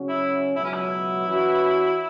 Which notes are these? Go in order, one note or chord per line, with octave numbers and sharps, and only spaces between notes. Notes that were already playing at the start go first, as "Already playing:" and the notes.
Already playing: C#3 F#3 C#4 F#4
E4
C#2 B2 F#3 E4
C#4
E4
E3 C#4 F#4 B4